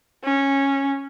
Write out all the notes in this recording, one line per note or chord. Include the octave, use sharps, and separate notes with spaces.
C#4